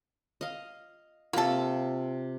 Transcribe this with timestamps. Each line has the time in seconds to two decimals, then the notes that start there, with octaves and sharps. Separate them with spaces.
0.41 D#5 F5
1.33 C3 A#3 F4 A4